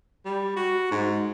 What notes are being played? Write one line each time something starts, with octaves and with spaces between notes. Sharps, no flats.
G3
F#4
G#2